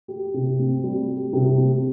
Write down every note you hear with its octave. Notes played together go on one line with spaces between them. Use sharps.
G4
C3
C4
G3
G4
C3
C4